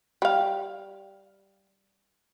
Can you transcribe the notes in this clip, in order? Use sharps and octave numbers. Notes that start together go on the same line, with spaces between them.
G3 F5